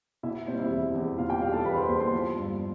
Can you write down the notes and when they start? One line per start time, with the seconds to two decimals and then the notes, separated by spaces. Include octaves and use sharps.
0.23 B2 E4 E5
0.47 G3 C4 C5
0.59 E4 E5
0.70 E2
0.94 E2
1.18 B2 F4 F5
1.30 G4 G5
1.41 G3 F4 F5
1.53 A4 A5
1.65 E2 B4 B5
1.77 C5 C6
1.88 E2 C5 C6
2.01 C5 C6
2.13 F3
2.36 G2